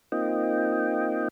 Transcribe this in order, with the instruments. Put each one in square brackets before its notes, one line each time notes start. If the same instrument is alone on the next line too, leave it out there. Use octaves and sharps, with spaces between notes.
[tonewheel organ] A#3 C4 D#4 F4 D#5 G5